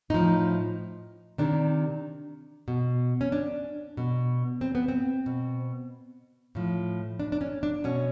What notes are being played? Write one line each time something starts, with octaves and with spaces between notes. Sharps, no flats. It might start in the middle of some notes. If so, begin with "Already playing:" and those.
A2 F3 D#4
C3 D#3 D4
B2
C#4
D4
B2
C4
B3
C4
B2
A2 F3
D4
D4
C#4
D4
B2 C#4